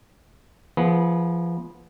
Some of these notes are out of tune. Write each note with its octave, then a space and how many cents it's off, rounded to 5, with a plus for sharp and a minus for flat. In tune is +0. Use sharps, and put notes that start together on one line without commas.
F3 -30 B3 -25 G#4 +15